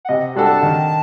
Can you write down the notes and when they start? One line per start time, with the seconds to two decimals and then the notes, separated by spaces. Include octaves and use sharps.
0.05 F#5
0.09 C3 D#5
0.35 G3 D4 F#4 A4
0.45 A5
0.63 D#3